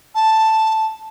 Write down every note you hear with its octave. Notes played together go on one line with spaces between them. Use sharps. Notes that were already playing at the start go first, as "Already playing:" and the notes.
A5